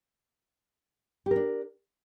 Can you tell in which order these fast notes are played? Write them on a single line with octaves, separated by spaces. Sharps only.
G4 A#4 D4